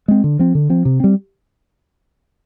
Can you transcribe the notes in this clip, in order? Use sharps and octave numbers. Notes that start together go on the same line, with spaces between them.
G#3 C4
D3
F3 C4
D3
F3 C4
C3
G3 C4